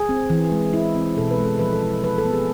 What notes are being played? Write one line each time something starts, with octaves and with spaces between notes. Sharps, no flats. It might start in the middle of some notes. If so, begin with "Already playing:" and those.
Already playing: G#4
C4
E3
G#3
E4
C4
B2 A4
B4
G#3
A4
F3 B4
A4
E4
F3 B4
A4
B3
G#4